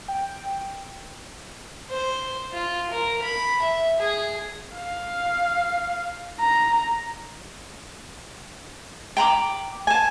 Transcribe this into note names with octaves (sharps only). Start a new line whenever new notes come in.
G5
C5
F4
A#4
B5
E5
G#4
F5
A#5
G5 A#5 B5 D6
G#5 A5